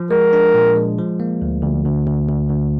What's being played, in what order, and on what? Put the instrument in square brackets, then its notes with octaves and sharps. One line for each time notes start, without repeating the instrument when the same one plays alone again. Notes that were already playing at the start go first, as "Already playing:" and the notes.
Already playing: [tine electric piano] F3
[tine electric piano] G#3 [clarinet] A#4
[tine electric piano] D4
A#2
G#3
F3
A#3
D2
D2
D2
D2
D2
D2